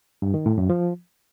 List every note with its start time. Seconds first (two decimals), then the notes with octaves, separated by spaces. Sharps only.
0.22 G2
0.34 D#3
0.46 A2
0.58 F#2
0.70 F3